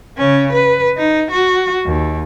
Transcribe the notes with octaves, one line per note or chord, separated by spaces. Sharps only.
C#3 C#4
B4
D#4
F#4
D#2